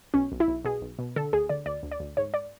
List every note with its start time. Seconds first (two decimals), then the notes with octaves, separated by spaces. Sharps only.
0.14 B1 C#4
0.32 B1
0.40 E4
0.48 B1
0.65 B2 G#4
0.81 B1
0.99 B2
1.16 D3 A4
1.33 D2 G#4
1.49 D3 D5
1.66 D2 D5
1.83 D2
1.91 D5
2.00 D2
2.17 G#2 C#5
2.34 D5